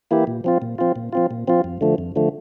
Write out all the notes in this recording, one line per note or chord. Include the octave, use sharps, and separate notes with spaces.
E3 A#3 E4 G4
A#2
F3 C4 F4
A#2
F3 C4 F4
A#2
F3 C4 F4
A#2
F3 C4 F4
F2
D3 F3 A3
F2
D3 F3 A3